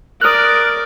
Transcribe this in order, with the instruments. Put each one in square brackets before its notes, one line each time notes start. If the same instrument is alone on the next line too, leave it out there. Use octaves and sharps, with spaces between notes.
[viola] A#4 D5 [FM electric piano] D#6 F6 F#6